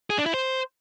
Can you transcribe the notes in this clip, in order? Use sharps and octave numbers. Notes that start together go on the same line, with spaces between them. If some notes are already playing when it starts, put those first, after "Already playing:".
G#4
D4
E4
C5